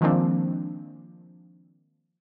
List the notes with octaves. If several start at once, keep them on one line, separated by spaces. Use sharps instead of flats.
D#3 F3 G#3 A#3 C4 D4